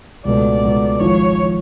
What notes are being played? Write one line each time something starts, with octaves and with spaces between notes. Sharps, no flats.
C#2 B2 F#3 A3 D5
C#2 B2 F#3 A3
G#1 G#2 F3 C#5
F3